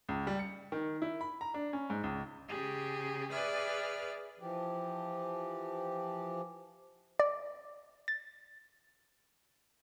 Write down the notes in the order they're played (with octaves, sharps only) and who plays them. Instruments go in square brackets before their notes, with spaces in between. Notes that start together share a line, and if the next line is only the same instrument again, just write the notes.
[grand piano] C#2
G3
C#7
D#3
E4
B5
A#5
D4
C#4
G#2
C#2
[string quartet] C#3 G4 G#4
G#4 B4 D5 E5 F6
[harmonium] E3 F3 G4
[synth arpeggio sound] D5
A6